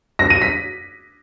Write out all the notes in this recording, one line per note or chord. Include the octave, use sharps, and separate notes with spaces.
A#6
D#7
B6